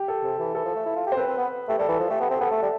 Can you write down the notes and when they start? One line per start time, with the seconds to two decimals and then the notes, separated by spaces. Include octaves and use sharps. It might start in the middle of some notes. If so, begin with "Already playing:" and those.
Already playing: G4
0.08 A4
0.23 C3
0.39 E3
0.55 E3 A4
0.65 F3
0.75 A3
0.86 E4
0.96 F4
1.06 G4
1.12 C5
1.16 C4 B4
1.27 C4
1.38 B3
1.68 A3 G4
1.78 G3 A4
1.88 E3
2.00 F3
2.10 A3 G4
2.20 B3
2.30 C4 G4
2.41 B3 A4
2.51 A3
2.62 G3